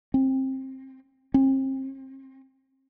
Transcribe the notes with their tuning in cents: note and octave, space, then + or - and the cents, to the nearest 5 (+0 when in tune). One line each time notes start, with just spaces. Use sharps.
C4 +20
C4 +35